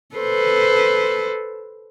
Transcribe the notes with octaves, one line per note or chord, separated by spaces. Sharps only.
A4 B4 C5